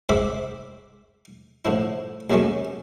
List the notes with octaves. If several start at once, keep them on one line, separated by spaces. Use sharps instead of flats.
G#2 C4 B4 E5 B5 D6
A2 D3 F3 E4
D#2 D#3 F#3 G#3 A3 C#4